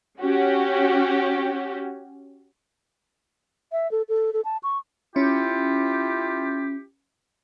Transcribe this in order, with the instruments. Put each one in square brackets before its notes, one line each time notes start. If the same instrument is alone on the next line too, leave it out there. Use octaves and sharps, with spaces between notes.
[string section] C#4 F#4 G4
[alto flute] E5
A4
A4
A4
A5
C#6
[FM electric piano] C#4 [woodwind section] E4 F4 G4